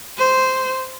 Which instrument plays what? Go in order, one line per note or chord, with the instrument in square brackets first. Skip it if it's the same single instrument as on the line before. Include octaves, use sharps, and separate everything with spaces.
[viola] C5